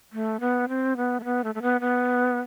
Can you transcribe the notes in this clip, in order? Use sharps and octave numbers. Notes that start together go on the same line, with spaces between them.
A3
B3
C4
B3
A3
B3
A3
A3
B3
B3